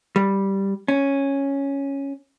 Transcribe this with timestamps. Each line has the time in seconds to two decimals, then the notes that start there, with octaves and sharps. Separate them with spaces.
0.16 G3
0.88 C#4